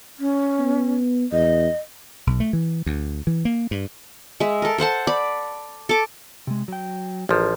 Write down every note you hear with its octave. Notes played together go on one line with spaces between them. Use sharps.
C#4
B3
E2 D#5
B1
A3
E3
D2
E3
A#3
G2
G#3 E5
A4 A#4
A4 C5 F#5 A5
D5 B5
A4 D6
C3 G#3
F#3 G5
A1 F3 G#4 A#4